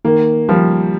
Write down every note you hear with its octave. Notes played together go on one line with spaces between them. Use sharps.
D#3 A#3
F3 G3